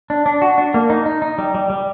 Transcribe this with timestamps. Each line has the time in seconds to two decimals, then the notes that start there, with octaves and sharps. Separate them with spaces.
0.10 D4
0.26 D4
0.42 F#4
0.58 D4
0.74 A#3
0.90 D#4
1.06 D#4
1.22 D#4
1.38 G3
1.55 G3
1.70 G3